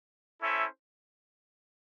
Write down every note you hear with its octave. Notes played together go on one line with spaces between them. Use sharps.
C#4 E4 A4 C5 E5